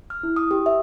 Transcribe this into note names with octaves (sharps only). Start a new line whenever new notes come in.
F6
E4
D#6
G4
E5